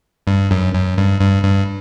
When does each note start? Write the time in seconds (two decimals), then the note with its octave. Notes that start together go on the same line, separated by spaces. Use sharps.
0.27 G2
0.51 F#2
0.73 F#2
0.98 G2
1.21 G2
1.44 G2